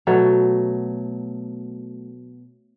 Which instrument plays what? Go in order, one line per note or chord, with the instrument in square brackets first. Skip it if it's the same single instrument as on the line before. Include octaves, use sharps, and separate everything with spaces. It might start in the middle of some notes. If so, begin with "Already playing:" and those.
[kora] B2 F#3 A3